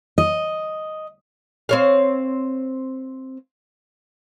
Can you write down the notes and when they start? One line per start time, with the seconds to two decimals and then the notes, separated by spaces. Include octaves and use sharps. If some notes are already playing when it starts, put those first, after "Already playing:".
0.18 D#5
1.69 C4 C#5 F5